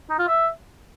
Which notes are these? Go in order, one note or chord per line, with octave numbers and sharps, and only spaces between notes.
D#4
F4
E5